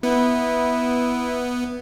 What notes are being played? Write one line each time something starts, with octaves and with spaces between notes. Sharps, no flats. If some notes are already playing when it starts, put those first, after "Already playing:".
B3 E4